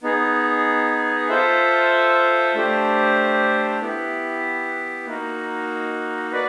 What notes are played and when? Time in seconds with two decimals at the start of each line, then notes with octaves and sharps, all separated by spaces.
0.03 B3 D#4 G#4
1.29 F4 A4 C5 E5
2.55 A3 D4 G4 C5
3.81 B3 E4 G4
5.06 A#3 D#4 F#4
6.32 F#4 B4 D5